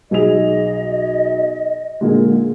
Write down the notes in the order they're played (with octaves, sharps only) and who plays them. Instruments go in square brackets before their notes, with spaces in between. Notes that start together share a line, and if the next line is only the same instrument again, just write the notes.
[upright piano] B1 G#4 F7 [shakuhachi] D#5
[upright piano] A#2 D3 G#3